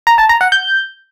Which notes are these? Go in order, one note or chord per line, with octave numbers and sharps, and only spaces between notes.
A#5
A5
A#5
F#5
G6